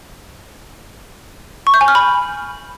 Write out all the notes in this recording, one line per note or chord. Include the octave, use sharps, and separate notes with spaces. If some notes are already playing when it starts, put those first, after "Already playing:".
C#6
G6
G#5
F6
B5